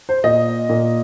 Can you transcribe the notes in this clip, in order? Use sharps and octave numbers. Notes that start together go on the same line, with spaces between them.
C5
A#2 D#5
A#2